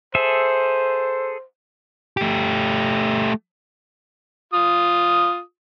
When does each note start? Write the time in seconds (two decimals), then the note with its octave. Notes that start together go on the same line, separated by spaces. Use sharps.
0.15 G#4 A4 C5 E5
2.17 A3 G4
4.54 F4 D#6